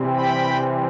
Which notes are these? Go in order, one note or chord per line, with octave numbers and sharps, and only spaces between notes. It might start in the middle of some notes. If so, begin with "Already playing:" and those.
Already playing: C3 E3 G3 C4
G5 B5